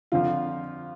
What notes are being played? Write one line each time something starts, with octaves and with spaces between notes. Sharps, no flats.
F2 D3 F3 F4